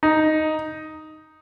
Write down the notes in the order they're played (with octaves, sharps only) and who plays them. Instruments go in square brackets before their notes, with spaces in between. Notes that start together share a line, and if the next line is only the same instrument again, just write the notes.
[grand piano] D#4